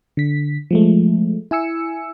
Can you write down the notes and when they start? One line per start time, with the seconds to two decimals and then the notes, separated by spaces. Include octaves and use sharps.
0.17 D3 B6
0.71 F3 G#3 A3
1.51 E4 G#5 E6 C#7